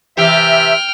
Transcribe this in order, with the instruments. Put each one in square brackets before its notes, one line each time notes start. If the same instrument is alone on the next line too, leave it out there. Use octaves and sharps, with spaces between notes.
[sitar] C3 E3 G4 [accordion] E5 [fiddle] G5 F6